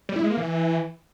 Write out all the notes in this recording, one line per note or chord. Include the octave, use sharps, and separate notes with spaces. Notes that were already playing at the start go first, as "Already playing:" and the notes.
G3
E4
G#3
A#3
E3